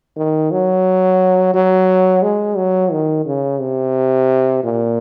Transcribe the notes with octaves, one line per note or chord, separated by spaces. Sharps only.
D#3
F#3
F#3
G#3
F#3
D#3
C#3
C3
A#2